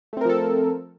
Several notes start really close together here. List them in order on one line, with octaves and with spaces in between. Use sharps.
A3 C4 A#4 F3 A4